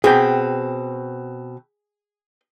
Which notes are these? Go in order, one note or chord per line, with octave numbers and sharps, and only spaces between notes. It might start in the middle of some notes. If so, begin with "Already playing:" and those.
B2 C4 G#4 G5